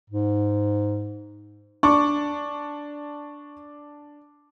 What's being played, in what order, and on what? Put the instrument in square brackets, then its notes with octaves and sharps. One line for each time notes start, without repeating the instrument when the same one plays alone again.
[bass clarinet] G#2
[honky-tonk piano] D4 [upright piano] C#6 D6